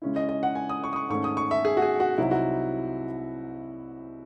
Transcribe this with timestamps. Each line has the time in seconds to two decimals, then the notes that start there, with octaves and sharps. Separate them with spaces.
0.02 C#3 G#3 C#4 E4
0.16 D#5
0.29 D#5
0.43 F#5
0.55 G#5
0.69 D#6
0.84 C#6
0.93 D#6
0.96 C#6
1.09 G#2 D#3 A3 C#4 C#6
1.24 D#6
1.37 C#6
1.51 E5
1.65 G#4
1.77 F#4
1.82 G#4
2.00 F#4
2.18 C2 C3 F#3 C4 D#4 E4
2.31 F#4